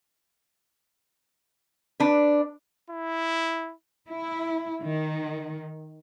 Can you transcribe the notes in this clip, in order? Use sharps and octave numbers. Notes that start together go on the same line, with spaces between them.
D4 B4
E4
E4
D#3